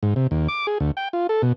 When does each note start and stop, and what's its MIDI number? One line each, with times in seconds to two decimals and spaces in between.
0.03 0.14 44
0.16 0.27 48
0.31 0.48 39
0.48 0.67 86
0.67 0.78 68
0.80 0.91 38
0.97 1.08 79
1.13 1.27 65
1.29 1.42 69
1.42 1.53 47